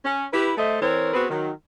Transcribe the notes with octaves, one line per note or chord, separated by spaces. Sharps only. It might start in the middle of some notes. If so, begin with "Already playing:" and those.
C#4
E4 G4 B4
A3 A4 C5 D#5 E5
E3 C4 A#4 C#5
B3 C4 F#4 G#4 B4
D#3 F#3